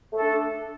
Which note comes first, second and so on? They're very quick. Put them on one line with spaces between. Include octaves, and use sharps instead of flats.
A3 A4 D4